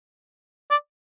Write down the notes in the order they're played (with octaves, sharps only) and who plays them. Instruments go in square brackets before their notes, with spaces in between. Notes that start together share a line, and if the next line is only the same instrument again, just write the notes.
[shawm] D5